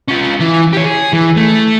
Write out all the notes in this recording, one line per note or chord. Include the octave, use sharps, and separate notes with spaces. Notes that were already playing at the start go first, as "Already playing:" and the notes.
C#4 F4
E3
G4 C#5
G#4
E3
A3